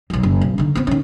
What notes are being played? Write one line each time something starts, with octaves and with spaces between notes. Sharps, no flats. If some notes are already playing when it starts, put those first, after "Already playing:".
B1 F2
F#1
B1
D3 D#4
B3 C4
D#3 C#4